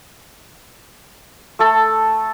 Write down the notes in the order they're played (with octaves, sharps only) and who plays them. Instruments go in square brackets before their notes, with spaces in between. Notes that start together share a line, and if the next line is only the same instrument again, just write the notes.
[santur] A3 A4